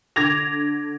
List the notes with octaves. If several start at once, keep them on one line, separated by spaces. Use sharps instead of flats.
D3 D6 G#6 A#6 F7